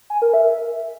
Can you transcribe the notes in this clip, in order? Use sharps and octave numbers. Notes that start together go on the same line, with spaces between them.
G#5
A#4
E5